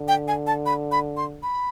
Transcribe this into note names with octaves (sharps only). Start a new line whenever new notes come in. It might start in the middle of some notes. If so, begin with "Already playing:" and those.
Already playing: D3
G5
G#5
A5
B5
B5
C6
B5